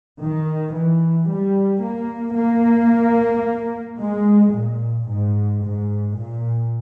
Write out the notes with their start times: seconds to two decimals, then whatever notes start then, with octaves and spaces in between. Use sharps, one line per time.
0.20 D#3
0.74 E3
1.28 G3
1.82 A#3
2.36 A#3
3.99 G#3
4.53 A#2
5.07 G#2
5.62 G#2
6.16 A#2